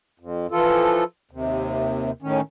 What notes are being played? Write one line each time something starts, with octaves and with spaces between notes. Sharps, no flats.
F2
E3 F3 F4 A4
D#2 C3
A2 D#3 C#4